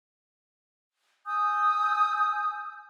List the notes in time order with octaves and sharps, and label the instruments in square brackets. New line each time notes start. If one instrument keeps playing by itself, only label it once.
[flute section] G#5 D#6 E6 G6